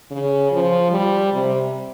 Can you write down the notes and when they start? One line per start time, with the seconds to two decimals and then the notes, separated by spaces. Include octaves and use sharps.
0.11 C#3
0.51 F3
0.91 G3
1.33 C3